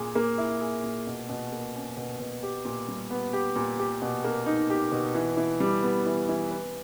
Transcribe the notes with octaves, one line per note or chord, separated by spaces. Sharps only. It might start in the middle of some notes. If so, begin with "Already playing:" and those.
Already playing: A#2 G#4
A#3
E4
G#4
A#2
B2
B2
A#3
C#4
B2
B2
G4
A#2
G3
B3
G4
A#2
G4
B2
A#3
D#4
G4
B2
E3
E3
G3
B3
E3
E3
B4